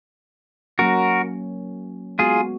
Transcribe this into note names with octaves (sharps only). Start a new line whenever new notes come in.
F#3 A#3 C#4 F#4 A#4
G#3 B3 F4 F#4 G#4